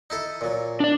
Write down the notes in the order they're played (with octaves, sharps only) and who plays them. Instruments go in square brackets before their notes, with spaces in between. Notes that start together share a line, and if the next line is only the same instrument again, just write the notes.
[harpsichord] D#4 E4 A4
A#2 F#3
[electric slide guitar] D4 D5